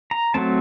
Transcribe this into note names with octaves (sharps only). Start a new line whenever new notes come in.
A#5
F#3 A3 C4 A5